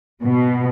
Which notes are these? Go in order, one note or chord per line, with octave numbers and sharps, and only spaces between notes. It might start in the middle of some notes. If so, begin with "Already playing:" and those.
B2